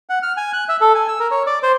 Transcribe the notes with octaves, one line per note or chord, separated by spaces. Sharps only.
F#5
F6
G#5
F#6
E5
A4
G#5
E6
A#4
C#5
D5
C5